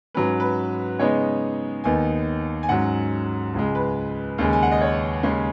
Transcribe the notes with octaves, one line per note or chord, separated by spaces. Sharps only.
G#2 F#3 C#4 B4
B4
C#3 G#3 B3 D#4 C#5
D#2 D#3 B3 D#4 G#5
G#5
G#2 F#3 C#4 F#5
C#2 C#3 G#3
B4
D#2 C#3 G#3 C#4
G#5
F#5
D#5
C#5
D#2 C#3 G#3 C#4